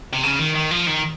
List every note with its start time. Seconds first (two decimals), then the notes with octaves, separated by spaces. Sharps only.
0.13 C3
0.23 C#3
0.39 D#3
0.55 D#3
0.71 F3
0.87 D#3